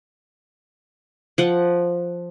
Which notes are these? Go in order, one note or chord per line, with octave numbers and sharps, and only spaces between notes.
F3 F#5